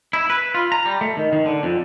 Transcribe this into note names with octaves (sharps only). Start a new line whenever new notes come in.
E4
B4
F4
A#5
G3
A3
D#3
D#3
D3
F2